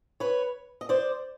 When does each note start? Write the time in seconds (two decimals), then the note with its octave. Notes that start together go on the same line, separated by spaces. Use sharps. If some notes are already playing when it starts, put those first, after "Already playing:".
0.20 B4 C#5
0.81 D#5
0.89 C5 D5